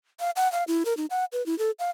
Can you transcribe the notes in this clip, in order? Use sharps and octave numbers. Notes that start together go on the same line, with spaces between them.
F5
F#5
F5
E4
A#4
D#4
F#5
B4
E4
A4
F5